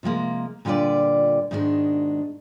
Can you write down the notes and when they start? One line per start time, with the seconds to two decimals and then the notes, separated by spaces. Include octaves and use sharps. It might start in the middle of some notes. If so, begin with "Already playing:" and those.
0.03 C3 F3 G#3 A#3
0.65 A#2 D3 G3 F4 B4 D5
1.51 G#2 B2 D#3 G#3 D4